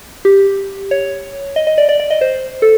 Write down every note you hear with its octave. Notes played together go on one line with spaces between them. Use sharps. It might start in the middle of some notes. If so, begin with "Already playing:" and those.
G4
C#5
D#5
D#5
D5
D5
D5
D#5
C5
A4